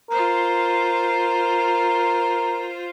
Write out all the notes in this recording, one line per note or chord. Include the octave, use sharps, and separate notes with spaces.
F4 A#4 C5